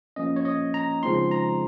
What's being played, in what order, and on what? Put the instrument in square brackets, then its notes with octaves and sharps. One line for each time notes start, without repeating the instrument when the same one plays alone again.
[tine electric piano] F3 A#3 C#4 D#5
C#5
D#5
A#5
C#3 F3 G#3 C4 D#4 C6
A#5